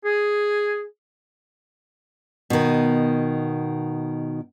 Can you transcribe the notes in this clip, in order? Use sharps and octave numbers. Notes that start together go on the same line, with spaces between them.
G#4
B2 D#3